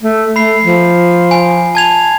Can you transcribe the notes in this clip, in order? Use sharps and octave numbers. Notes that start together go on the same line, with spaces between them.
A3
A3 B5 C7
F3
G#5
A5 G#6 F7